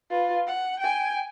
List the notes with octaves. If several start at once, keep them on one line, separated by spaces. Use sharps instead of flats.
F4 B4
F#5
G5 G#5